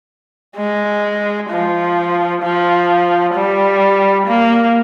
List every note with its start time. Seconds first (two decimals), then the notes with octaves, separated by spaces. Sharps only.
0.57 G#3
1.50 F3
2.43 F3
3.34 G3
4.27 A#3